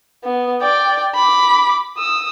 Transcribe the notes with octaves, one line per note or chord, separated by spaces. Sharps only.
B3
D5 G5
B5 D6
D#6 E6